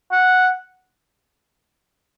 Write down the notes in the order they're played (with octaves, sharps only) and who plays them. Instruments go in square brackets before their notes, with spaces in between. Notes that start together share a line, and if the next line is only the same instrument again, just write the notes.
[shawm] F#5